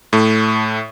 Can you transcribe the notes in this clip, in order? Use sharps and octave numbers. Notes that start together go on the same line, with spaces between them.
A2 A3